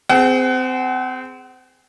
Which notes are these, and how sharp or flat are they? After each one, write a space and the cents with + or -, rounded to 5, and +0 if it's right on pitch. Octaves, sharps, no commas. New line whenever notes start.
C4 -25 G#4 +0 F#5 +35